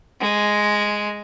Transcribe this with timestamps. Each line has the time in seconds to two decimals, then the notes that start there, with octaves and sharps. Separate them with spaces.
0.21 G#3